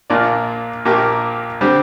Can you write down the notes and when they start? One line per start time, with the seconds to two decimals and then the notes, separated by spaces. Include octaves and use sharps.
0.10 A#1 A#2 A#3 F4 D5
0.85 A#1 A#2 A#3 G4 A#4
1.61 D3 G3 C4 G4